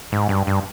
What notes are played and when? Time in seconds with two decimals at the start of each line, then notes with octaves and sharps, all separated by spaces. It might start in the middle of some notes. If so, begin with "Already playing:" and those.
0.12 G#2
0.29 G2
0.47 G2